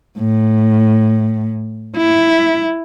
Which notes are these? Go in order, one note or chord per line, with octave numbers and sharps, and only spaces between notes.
A2
E4